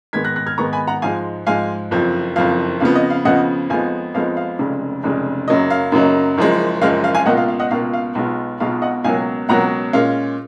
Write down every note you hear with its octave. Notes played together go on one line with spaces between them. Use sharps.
G#2 D#3 G#3 B3 G#6 B6
F#6 A#6
F#6 A#6
F6 G#6
G#2 D#3 G#3 B3 A#5 C#6
G#5 B5
F#5 A#5
G#2 F3 G#3 F5 G#5
G#2 F3 G#3 F5 G#5
F#1 F2 F3
F#1 F2 F3 F5
F2 C#3 F3 B3 F5
D#5
F5
F2 C#3 F3 B3 D#5 F#5
F2 F3 G#3 B3 D#4 F5 G#5
F2 F3 G#3 B3 D#4 F5
F5
F1 F2 C#3 G#3
F1 F2 C#3 G#3
F#2 C#3 F#3 A#3 D#4 D#5
F5
F#2 C#3 F#3 A#3 D#4
F#1 F#2 F3 G#3
F#1 F#2 F3 G#3 F5
F5
F5 G#5
C#2 B2 A#3 F4 D#5 F#5
F5
F5
D#5 F#5
C#2 B2 A#3 F4 F5
F5
B1 B2 G#3 B3 F4
B1 B2 G#3 B3 F4 F5
D#5 F#5
C#2 B2 F#3 A#3 F5 G#5
C#2 B2 F#3 A#3 F#5 A#5
A#2 G#3 C#4 F5